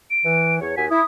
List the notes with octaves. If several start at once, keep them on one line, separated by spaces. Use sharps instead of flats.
D7
E3
E2 C#5
D#2 F#4 G#5 B6
E4 D#6